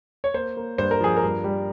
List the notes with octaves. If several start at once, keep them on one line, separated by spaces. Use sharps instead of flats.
C#5
A#3 C5
A#3
G2 C5
A#4
F3 G#4
A#4
G2
G3